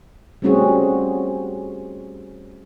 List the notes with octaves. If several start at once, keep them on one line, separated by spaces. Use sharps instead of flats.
G3 A3 C4 C#4 F#4 G#4